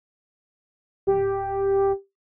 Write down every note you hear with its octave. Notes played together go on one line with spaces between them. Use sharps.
D1 G4